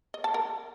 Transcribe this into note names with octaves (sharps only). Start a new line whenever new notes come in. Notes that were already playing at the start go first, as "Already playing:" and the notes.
D#5
A5
A#4